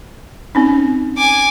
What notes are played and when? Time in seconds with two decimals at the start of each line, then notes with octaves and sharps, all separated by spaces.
0.55 C4 C#4 D#4
1.18 G#5 D6